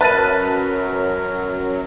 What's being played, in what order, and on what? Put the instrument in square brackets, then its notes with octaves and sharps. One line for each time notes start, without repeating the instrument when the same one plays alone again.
[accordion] F#2 F#3 [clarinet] A#4 [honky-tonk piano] B4 [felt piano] A5 A6 D#7